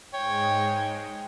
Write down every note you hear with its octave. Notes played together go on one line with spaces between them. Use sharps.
G#2 G#3 C#5 G5